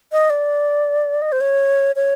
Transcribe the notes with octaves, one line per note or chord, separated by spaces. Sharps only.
D#5
D5
D#5
C5
C#5
C#5